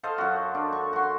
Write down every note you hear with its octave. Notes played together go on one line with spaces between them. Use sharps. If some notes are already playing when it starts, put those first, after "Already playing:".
A4 C5 D#5 F5
F#2 F#4
D4
C#6
F#4 C6